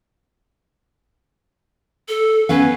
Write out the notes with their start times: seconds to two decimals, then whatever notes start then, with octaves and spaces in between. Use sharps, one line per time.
2.09 A4
2.49 B3 C#4 B4 F5